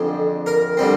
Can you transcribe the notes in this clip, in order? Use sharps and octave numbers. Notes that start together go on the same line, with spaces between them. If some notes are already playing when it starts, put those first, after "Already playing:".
Already playing: F2 D3 G#3 C4
A#4
D3 G3 C4